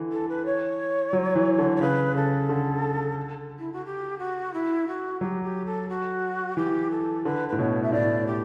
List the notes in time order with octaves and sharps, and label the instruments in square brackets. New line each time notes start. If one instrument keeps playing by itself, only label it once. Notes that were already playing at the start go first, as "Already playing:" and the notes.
Already playing: [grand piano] D3 E3
[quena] A4
B4
C#5
[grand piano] F#3
E3
D3
[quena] C#5
[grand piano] C#3 [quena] B4
[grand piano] C#3 [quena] A4
[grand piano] D3
[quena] E4
F#4
G4
F#4
E4
F#4
[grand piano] F#3 [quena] G4
[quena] G4
A4
F#4
[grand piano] E3 [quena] G4
[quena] A4
[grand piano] D3 [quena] B4
[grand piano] A2 [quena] B4
[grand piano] B2 [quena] C#5
[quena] E5
[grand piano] A2 [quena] D5
[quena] G4